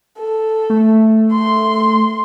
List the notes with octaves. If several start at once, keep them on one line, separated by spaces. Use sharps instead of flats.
A4
A3
C6